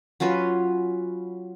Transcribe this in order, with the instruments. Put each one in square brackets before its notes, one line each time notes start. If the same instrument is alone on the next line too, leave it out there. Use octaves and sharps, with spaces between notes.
[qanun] F#3 C#4 F4 B4